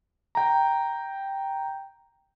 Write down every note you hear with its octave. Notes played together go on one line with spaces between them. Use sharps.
G5 A#5